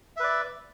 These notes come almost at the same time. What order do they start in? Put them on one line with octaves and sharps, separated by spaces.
E5 B4 D5